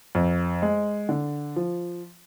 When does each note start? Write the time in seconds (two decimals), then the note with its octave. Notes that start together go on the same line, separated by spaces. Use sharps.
0.15 F2
0.62 G#3
1.09 D3
1.56 F3